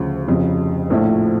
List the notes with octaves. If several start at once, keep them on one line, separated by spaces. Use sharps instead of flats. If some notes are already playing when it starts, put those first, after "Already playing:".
Already playing: D2 C#3 F3
F1 F2 C#3
A#1 A2 F3 A3